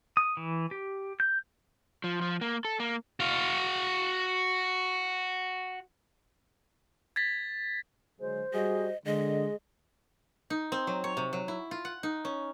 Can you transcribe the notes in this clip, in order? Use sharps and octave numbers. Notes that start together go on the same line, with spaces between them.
D#6
E3
G4
G6
F3
F3
A#3
A4
A#3
F#4 F5
G#6 A6 B6
D3 F#3 G#3 C5
G3 F#4 G#4 D#5
D3 G#3 G#4 D#5
D#4
C4
F#3
C#5
C3
F#3
E4
F4
F#5
D#4
C#4